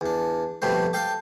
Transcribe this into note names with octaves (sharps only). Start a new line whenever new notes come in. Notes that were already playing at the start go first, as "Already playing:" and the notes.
E2 D4
F2 B2 G3 A3 C5
A4 F5 G5 D6